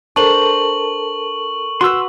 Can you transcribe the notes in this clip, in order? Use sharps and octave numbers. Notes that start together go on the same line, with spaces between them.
D4 A4 A#4 C5 A5 C#6 F#7
F#4 B4 C6 E6